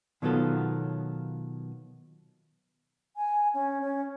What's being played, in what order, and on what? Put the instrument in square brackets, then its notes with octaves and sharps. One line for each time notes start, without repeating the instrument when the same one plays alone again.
[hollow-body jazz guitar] B2 D#3 F#3 B3 F4 A4
[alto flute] G#5
C#4
C#4